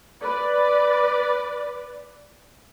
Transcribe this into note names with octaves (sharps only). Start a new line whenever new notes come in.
B4 D5